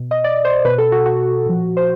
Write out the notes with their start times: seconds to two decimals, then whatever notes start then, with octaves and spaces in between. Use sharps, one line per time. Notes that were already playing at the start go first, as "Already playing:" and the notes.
Already playing: B2
0.11 D#5
0.24 D5
0.45 C5
0.65 B2 B4
0.78 A4
0.92 F#4
1.06 F#4
1.46 A#2 F3
1.77 C5